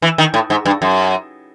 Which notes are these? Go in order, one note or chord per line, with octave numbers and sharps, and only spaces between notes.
E3
D#3
A2
G#2
G2
F#2